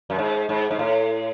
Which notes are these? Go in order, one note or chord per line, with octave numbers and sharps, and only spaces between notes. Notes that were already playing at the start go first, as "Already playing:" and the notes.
F#2
G#2
G#2
G#2
A2